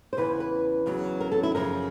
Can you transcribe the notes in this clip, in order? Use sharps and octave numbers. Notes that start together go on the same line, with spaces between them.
C5
E2 C#3 E3 B4
B4
E2 C#3 F#3
A#4
A4
E4
F#2 C#3 F3 A#4